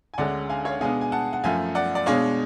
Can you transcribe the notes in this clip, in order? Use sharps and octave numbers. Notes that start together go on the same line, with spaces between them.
G#5
D2 D3 G#3 C#4 D5 F#5
F5 G#5
C#5 F5
B2 G#3 B3 D4 F5 G#5
G#5
F#5 A5
F#5
F#2 F3 A3 F5 G#5
D5 F#5
D5
B2 G#3 D4 C#5 F5